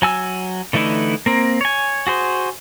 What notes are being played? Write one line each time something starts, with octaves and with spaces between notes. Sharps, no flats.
F#3 G#5 E6
D3 E3 A3 D#4 E4
A#3 C4 A#4
C#5 G#5
F#4 G#4 C5